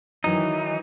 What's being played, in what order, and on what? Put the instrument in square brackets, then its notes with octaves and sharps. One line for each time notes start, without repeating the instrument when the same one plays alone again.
[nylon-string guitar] D#3 F#3 [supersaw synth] E3 [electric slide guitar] D#4